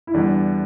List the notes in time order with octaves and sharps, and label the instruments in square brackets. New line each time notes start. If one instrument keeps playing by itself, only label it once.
[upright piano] E4
[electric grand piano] E2 D3 G3 [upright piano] D4